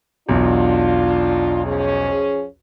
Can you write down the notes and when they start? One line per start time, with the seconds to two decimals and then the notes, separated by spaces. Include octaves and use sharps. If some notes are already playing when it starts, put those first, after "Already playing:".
0.29 B1 E2 D4 F4
1.66 F3 C#4 G#4